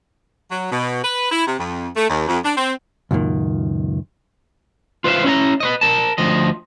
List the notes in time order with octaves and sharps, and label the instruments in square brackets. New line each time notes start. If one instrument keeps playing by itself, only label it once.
[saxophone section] F#3
B2
B4
E4
C3
F2
A3
D#2
F2
D4
C4
[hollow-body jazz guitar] C#2 F#2 A#2 D#3
[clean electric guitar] F4 B4 C5 D5 E5 F5
C#4 E4 G#5 A#5
B4 C#5 D#5
A#4 A5
D2 F3 D#5